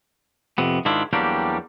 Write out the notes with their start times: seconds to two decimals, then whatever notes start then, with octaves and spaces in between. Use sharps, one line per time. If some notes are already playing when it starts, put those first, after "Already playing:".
0.58 F2 C3 B3
0.85 G#2 D#3 D4 E4 F4
1.13 E2 F#3 G3 A#3 D4 G4